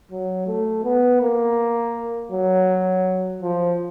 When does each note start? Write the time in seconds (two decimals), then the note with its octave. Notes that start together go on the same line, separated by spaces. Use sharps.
0.11 F#3
0.47 A3
0.84 B3
1.21 A#3
2.32 F#3
3.42 F3